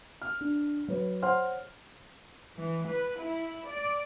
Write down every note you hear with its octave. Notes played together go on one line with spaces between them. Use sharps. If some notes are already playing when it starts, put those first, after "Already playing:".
F6
D4
F#3 B4 C#5
C5 C#5 F#5 C6 F6
E3
B4
E4
D5